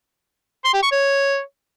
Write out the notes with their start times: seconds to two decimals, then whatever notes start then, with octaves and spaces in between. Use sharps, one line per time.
0.65 C6
0.74 G4
0.83 C#6
0.92 C#5